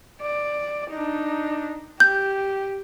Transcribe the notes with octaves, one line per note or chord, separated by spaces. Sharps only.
D5
D4 D#4
G4 G6